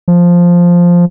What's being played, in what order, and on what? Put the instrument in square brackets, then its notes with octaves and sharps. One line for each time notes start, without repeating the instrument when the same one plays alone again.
[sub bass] F3